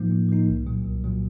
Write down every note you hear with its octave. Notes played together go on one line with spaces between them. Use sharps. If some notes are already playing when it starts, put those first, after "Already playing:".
Already playing: A2 F3 A#3 D#4
A2
F3 A#3 D#4
C2
A#2 F#3
C2
A#2 F#3